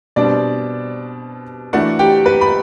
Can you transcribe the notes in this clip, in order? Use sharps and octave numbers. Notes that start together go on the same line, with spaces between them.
B2 G3 C4 D4 D5
E3 A3 D4 F#4 F#5
G4 G5
B4 B5
B5